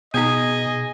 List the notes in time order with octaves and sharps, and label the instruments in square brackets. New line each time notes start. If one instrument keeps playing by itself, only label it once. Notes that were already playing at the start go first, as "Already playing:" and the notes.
[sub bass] B2 [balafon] B3 D#4 [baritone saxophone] G#4 [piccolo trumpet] D#5